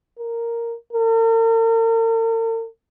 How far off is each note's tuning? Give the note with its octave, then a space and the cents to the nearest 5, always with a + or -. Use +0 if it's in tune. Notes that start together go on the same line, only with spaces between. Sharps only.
A#4 -5
A#4 -45